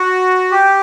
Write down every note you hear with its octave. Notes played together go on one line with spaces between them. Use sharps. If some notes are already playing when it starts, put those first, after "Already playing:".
Already playing: F#4
G4